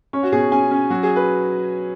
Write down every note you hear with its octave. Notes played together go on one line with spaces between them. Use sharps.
C#4 C#5
F#4
B2 G#4
C#4 G#5
C#4
F#3 F#4
G#4
B4